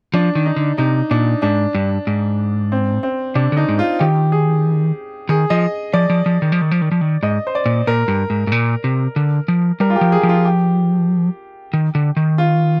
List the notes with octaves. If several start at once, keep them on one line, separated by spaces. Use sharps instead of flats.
F3 D4
D#3
D#4
D3
C3 D#4
A#2 D4
G#2 D4
G2
G#2
C4
C4
C3 D4
D3 D#4
G#2
F4
D#3 G4
G#4
D#3 G#4
F3 D#5
F3 D5
F3
F3
D#3
F3
D#3
F3
D#3
F3
D#3
G#2 D#5
C5
D5
A#2
A#2 A#4
G2
G#2
G#2
A#2
C3
D3
F3
G3 A#4
F4
G4
F3
G#4
F3
F4
G4
D#3
D3
D#3
F4